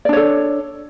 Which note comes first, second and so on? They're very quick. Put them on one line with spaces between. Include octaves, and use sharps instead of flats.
D5 D4 C#5 A4